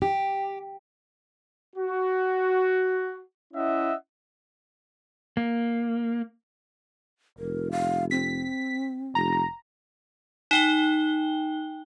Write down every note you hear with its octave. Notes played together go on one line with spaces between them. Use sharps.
G4
F#4
C#4 E4 D#5 E5 F#5
A#3
F1 A#4
F5
C4 B6
F1 A#5
D#4 G5 G7